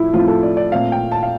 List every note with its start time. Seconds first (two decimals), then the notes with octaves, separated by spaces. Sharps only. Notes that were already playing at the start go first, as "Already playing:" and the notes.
Already playing: A2 F3 A3 E4
0.13 A2 F3 A3 C4 F4
0.28 A4
0.43 D5
0.57 D5
0.72 A#2 A3 C4 F5
0.92 G5
1.12 A5
1.23 F5